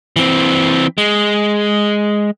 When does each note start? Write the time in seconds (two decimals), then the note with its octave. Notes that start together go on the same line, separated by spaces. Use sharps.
0.16 E3 C4
0.98 G#3